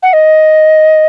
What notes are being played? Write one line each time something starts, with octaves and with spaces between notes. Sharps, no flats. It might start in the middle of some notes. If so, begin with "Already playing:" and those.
F#5
D#5